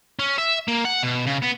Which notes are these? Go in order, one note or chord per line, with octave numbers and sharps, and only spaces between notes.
C#4
E5
A#3
F#5
B2
C#3
B3